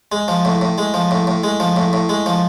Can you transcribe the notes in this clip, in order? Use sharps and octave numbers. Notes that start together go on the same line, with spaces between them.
G#3
F3
A2
A2
G#3
F3
A2
A2
G#3
F3
A2
A2
G#3
F3